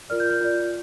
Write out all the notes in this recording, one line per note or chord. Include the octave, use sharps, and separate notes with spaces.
F4 A#4 D5 F6
G6
G6
F4 D5